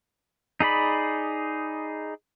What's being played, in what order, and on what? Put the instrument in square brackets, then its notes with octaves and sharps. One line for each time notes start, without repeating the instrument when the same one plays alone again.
[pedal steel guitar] D#4 G#4 D5 B5